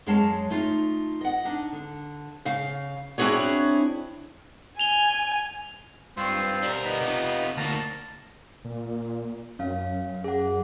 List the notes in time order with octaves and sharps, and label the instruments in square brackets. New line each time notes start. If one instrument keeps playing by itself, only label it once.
[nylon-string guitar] F#2 G#3 C#5 D#5 F5 A5
A3 D#4 F4
D#5 F#5
D4 D#4
D3
[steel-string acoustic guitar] C#3 F5
C4 D4 E4 F#4 G#4 C#5
[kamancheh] G#5 [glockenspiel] F7 G7
[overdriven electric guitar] G2 [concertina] C4 F4 C5
[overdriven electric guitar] G3 A#4
[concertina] B3 D#4 B5
[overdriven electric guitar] C3 F4
[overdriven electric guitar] D2 A#3 [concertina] A5 A#5 F6
[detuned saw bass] A#2
[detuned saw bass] F#2 [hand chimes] C#4 F5
[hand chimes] G#4 F#5